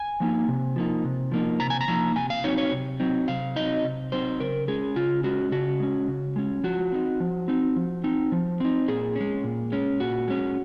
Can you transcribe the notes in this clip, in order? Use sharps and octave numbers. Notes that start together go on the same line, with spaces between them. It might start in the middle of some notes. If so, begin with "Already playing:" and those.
Already playing: G#5
F3 A#3 D#4
C3
F3 A#3 D#4
C3
F3 A#3 D#4
C3 A#5
G#5
A#5
F3 A#3 D#4
C3 G#5
F5
F#3 C4 D#4 C#5
C#5
C3
F#3 C4 D#4
C3 F5
F#3 C4 D#4 D#5
C3
F#3 C4 D#4 C5
C#3 A#4
G#3 C#4 G#4
C#3 F4
G#3 C#4 F#4
C#3 F#4
G#3 C#4
C#3
G#3 C#4
F3 F#4
C4 D#4
F3
C4 D#4
F3
C4 D#4
F3
C4 D#4
A#2 G#4
G#3 C#4
A#2
G#3 C#4
A#2 F#4
G#3 C#4